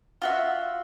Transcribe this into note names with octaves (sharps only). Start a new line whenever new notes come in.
F4 F#4 E5